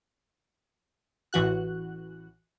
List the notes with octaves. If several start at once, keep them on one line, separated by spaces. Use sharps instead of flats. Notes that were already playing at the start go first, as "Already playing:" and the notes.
A1 E3 F#4 F#6